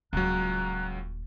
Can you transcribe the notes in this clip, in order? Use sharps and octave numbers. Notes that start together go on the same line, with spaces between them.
D#1 C#2 F#3 F4 A#5 F#6